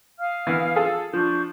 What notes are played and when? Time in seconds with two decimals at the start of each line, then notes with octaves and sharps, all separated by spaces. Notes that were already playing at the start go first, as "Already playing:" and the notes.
0.19 F5 D#6 F6
0.47 E3 B3
0.76 F4 G#4 A4
1.13 F3 D4 C#6 G6